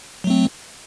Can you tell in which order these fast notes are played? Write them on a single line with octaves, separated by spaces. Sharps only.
F#3 A3 C4